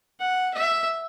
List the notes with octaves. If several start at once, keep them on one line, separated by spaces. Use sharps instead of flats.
F#5
E5